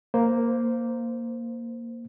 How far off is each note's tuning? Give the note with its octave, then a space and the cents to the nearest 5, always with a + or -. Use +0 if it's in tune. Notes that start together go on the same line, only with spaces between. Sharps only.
A#3 +0 C5 -10